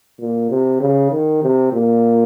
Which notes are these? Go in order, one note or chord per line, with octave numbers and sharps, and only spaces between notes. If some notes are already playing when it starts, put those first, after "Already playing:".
A#2
C3
C#3
D#3
C3
A#2